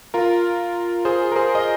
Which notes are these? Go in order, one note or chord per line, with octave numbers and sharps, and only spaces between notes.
F4 A#4
G#4 C5
A#4
G#4 C5
D#5